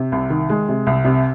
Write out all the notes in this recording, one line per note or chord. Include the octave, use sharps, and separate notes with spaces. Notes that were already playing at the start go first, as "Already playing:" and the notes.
Already playing: C3
C2
D#3
G#3
C3
C2
C3